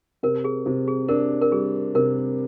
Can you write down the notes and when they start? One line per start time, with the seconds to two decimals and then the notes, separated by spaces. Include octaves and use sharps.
0.23 C3 A#4
0.44 G#4
0.66 C3
0.88 G#4
1.09 D4 A#4
1.41 A#4
1.52 G3 G#4
1.95 C3 A#4